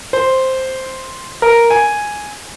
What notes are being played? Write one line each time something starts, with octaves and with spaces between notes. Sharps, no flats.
C5
A#4
G#5